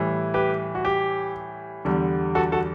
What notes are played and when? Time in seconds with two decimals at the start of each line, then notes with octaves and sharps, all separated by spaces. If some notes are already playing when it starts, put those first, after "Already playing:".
Already playing: A2 E3 G3
0.34 G4 B4
0.75 F#4
0.85 G4
1.85 E2 D3 G3
2.35 F#4 A4
2.52 F#4 A4